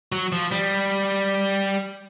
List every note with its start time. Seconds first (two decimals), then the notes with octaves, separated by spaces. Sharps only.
0.12 F#3
0.32 F3
0.52 G3